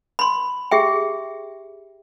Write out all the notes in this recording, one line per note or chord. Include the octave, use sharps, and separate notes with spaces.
B5 C6
G4 G#4 E5 G5